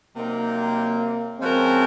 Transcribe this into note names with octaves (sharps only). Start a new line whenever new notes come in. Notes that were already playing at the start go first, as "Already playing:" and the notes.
C3 F#3 A#3 C4 D#4 A#4
F3 G#3 C4 C#4 F#4 A#4